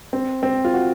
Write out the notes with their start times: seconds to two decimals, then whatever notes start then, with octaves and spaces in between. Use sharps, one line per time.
0.13 C4
0.43 C4
0.65 F4
0.74 F#4